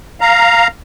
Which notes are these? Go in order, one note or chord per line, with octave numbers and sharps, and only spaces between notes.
F5 A#5